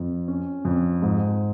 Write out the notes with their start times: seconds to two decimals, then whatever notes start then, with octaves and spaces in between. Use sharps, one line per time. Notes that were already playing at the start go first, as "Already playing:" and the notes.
Already playing: F2
0.28 C#4
0.65 F2
1.02 G#2